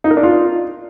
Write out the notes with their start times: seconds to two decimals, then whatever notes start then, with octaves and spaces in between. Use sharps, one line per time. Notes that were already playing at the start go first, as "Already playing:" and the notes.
0.04 D#4
0.11 A#4
0.17 D4
0.23 F4